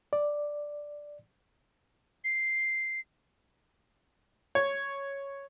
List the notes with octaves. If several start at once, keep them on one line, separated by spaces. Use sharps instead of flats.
D5
C7
C#5